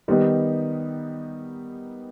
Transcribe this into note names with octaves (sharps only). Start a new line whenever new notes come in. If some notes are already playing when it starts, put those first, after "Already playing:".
D#3 G3 B3 D#4